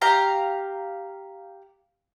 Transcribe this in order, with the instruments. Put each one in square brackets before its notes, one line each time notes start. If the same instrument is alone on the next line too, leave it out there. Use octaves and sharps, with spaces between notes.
[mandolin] G4 F5 A#5